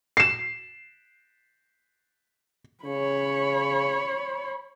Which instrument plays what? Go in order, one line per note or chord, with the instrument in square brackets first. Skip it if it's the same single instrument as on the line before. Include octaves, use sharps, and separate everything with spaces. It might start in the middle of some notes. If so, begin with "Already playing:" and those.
[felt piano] C7 E7
[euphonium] C#3 [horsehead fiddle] C#5 B5